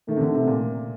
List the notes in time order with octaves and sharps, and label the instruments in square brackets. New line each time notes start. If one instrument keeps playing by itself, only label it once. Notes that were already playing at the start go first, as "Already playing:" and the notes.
[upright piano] D#3 [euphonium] A3
[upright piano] C3
D3
C3
A#2